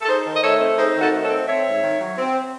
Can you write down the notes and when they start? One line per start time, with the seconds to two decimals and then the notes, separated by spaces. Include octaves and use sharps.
0.02 A4
0.07 D#4 G#4 C5
0.25 D#3
0.36 D#5
0.42 A3 A4 C#5
0.59 C4
0.77 D#4 G#4 C5
0.95 D#3
1.01 F#4 A4
1.12 A3
1.23 A4 C#5
1.29 C4
1.47 C4 C#5 E5
1.65 G#2
1.82 D#3
2.00 F#3
2.18 C4